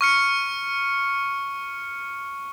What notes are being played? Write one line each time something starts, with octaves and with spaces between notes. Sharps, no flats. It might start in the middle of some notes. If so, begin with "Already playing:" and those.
C#6 F6 C#7